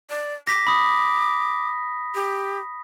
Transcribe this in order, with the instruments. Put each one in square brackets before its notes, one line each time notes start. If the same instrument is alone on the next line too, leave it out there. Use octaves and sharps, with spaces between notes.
[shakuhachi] D5
[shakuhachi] D6 [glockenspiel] A#6 B6
[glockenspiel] B5 D#6
[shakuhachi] G4